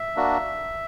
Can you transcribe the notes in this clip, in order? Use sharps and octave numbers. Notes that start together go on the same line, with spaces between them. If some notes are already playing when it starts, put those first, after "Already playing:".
Already playing: E5
A#3 D4 F#4